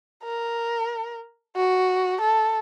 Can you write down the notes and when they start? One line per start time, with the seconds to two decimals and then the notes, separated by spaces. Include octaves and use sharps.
0.24 A#4
1.56 F#4
2.21 A4